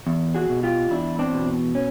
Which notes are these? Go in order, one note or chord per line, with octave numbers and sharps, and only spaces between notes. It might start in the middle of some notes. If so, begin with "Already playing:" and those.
E2
F#4 G#4
B2
F4 G4
E2 D4 E4
C4 D4
B2
C#4